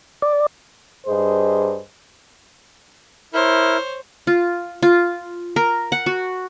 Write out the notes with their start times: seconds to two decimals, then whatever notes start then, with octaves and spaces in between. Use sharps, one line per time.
0.22 D5
1.07 G2 G#4 C5 D#5
3.34 E4 A#4 C5 C#5
4.27 F4
4.82 F4
5.56 A#4
5.92 F#5
6.06 F#4